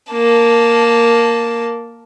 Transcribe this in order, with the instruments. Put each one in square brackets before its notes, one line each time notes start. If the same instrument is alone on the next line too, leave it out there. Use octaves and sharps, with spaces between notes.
[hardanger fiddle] A#3 A5